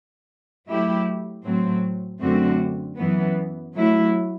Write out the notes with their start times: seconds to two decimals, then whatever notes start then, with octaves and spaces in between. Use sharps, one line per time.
0.68 F#3 A3 E4 G4
1.45 A2 F#3 C4
2.21 F#2 D3 A3 C4 F#4
2.98 F#2 E3 B3
3.74 F#3 A3 E4